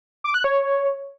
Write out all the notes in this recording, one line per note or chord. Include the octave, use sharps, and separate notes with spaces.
D6
F#6
C#5